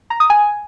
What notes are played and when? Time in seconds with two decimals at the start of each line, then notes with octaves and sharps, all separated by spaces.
0.10 A#5
0.20 D#6
0.30 G#5